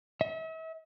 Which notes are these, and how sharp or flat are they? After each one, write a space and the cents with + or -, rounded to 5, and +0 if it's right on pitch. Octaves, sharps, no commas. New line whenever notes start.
E5 -40